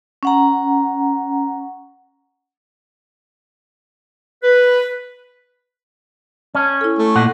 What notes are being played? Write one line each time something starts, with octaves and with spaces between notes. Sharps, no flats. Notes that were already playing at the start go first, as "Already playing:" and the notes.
C#4 F#5 A#5
B4
C#4 A5
E4 A4
A3
A#2 F#5